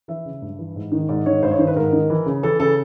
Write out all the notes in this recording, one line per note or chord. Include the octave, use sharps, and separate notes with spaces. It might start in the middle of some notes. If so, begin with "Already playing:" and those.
E3 E5
C#3
G2
E3
G#2
D#3
G#2 D5
D#3 C#5
G2 C5
C#5
D#3 C5
B4
G#2 A#4
D#3
E3
C#3
E3 A4
C#3 A4